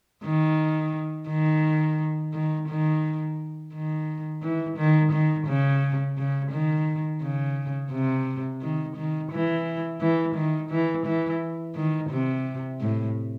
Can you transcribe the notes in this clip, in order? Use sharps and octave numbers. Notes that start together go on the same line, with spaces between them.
D#3
D#3
D#3
D#3
D#3
E3
D#3
D#3
C#3
C#3
D#3
C#3
C3
D#3
D#3
E3
E3
D#3
E3
E3
D#3
C3
A2